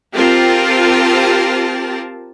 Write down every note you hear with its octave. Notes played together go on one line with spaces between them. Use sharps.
C4 F4 G4 A#4 A5